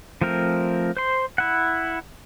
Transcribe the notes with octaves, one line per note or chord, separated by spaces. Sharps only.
F3 A3 C4 A#4
C5 C6
E4 F#5